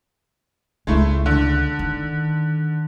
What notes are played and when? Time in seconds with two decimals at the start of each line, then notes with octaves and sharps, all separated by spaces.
0.87 C#2 G#3 A3 E4
1.26 D3
1.79 D#3